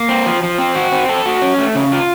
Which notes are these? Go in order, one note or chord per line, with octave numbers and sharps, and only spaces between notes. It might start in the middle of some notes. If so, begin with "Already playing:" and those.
Already playing: A#3
C4
F3
F3
C4
F#4
C4
A4
F#4
C#4
A3
C#3
F4